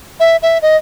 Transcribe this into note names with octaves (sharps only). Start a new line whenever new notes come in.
E5
E5
D#5